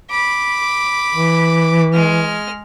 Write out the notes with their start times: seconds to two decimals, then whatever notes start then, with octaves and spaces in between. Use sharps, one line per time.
0.11 B5 D6
1.15 E3
1.93 G#3 F6